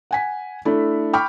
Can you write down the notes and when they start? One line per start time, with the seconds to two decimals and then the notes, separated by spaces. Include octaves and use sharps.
0.11 F#5 G#5 B6
0.65 A3 D4 E4
1.13 G5 B5 C#6 D6 F6